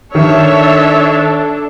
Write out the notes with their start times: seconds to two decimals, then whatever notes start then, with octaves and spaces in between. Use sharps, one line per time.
0.15 D#3 D4 A4 C#5 E5